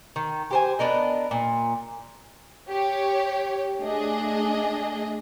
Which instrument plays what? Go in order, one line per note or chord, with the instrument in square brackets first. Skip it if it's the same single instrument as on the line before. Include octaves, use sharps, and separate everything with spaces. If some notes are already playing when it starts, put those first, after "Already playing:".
[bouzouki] D#3
G4 C5 G#5
B3 D4 A#4 D#5
A#2
[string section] G4 C#5
A3 D4 G#4 D#5